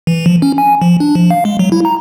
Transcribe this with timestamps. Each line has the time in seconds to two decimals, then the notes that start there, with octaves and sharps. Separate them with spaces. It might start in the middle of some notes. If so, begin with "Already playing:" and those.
0.07 E3
0.26 F3
0.42 C#4
0.58 G#5
0.82 F3
1.00 D4
1.15 F3
1.31 F5
1.45 G#3
1.59 F#3
1.72 E4
1.85 A#5